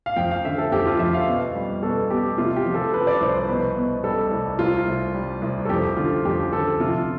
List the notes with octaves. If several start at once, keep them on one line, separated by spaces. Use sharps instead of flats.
F5
F2 G5
F5
D3 E5
A4
F2 G4
F4
F2 E5
F5
B2
G3
B2 A4
B2 G4
C3 F4
G4
F3
A4
F3 B4
D5
C2 C5
C5
B2 B4
B2
G3 A4
C2
C2 F4
C2
G3
C2
A4
F2 G4
D3 F4
F2 G4
D3 A4
C3 F4